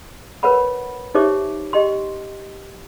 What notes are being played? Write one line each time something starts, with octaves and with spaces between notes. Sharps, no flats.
A#4 B4 C#5 F#5 B5
D#4 G4 C5 C#5 E5 D6
G4 D#5 G5 C6